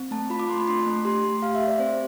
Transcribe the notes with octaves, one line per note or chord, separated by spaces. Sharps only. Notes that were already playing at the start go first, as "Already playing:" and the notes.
Already playing: C4
A3 A5
F4 B5
D6
A3 C6
B5
D4 C6
A3
G4 C6
A3 C6
G4 F5
E5
G4
D5
C4 C5